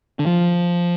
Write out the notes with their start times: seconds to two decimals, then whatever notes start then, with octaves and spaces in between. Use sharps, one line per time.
0.19 D3
0.26 F3